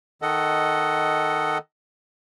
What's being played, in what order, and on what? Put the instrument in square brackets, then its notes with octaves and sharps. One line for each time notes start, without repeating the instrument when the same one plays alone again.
[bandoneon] D#3 A4 D#5 F#5